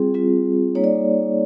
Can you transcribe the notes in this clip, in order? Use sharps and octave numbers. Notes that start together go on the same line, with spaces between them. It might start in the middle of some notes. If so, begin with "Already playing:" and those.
Already playing: G3 C4 F4 G#4
G3 C4 F4
G3 A#3 D#4 C#5
D5